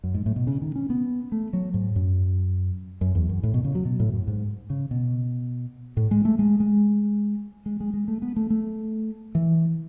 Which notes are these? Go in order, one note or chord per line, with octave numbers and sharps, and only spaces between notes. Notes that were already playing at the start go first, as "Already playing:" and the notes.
F#2
G#2
A2
B2
C#3
D#3
C#4
B3
A3
F#3
G#2
F#2
F#2
E2
F#2
A2
B2
C#3
F#3
B2
A2
F#2
G#2
C#3
B2
A2
G#3
A3
G#3
G#3
G#3
G#3
G#3
A3
B3
A3
A3
E3